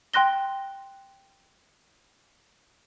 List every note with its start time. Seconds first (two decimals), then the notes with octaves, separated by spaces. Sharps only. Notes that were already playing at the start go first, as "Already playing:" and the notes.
0.14 G5 C6 F#6 A#6 G7